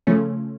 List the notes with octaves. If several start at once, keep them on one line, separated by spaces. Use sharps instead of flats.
C#3 F3 A3 C#4